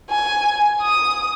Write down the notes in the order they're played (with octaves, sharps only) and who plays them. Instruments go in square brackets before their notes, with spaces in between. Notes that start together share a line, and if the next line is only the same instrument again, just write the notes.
[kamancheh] G#5
D#6